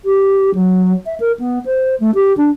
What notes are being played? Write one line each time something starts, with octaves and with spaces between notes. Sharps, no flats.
G4
F#3
E5
A#4
B3
C5
A3
G4
D4